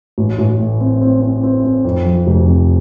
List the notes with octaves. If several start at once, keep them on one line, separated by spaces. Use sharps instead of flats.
A1
A1
A2
C4
C4
C4
C4
C4
F2
F3
F1
F2